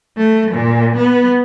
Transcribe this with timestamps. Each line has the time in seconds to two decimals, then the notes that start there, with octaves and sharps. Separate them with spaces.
0.17 A3
0.51 A#2
0.96 B3